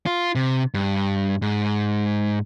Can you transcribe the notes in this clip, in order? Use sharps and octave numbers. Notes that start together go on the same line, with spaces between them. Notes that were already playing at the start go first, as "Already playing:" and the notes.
F4
C3
G2
G#2